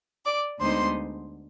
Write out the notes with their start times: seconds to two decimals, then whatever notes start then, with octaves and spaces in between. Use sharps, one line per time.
0.25 D5 D6
0.60 D2 D3 G#3 B3 D#4 C5 C6